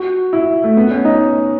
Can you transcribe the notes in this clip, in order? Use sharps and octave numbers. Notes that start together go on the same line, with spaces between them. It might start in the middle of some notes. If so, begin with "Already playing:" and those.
Already playing: F#4
E4
A3
B3
C#4
D#4